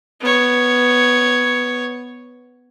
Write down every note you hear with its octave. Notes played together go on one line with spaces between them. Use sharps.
B3 C#5